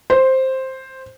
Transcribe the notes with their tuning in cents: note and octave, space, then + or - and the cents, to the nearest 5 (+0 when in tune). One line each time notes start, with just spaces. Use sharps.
C5 +5